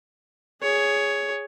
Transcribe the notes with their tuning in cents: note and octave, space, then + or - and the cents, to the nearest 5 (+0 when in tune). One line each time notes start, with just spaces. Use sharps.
G#4 +0 C#5 +10